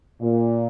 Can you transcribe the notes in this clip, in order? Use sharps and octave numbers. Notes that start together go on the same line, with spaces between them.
A#2